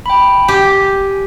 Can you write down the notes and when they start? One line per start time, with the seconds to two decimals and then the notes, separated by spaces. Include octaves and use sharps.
0.06 G5 B5
0.48 G4 G#5